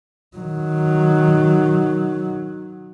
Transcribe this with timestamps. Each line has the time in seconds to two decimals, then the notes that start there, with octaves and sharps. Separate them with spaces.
0.37 D#3 F#3